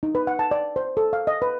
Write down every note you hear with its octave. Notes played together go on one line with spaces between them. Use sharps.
D#4
B4
F#5
A5
D5
C5
A4
F5
D#5
B4